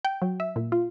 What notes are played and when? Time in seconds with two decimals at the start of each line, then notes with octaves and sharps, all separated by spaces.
0.05 G5
0.22 F#3
0.40 E5
0.56 A#2
0.72 F4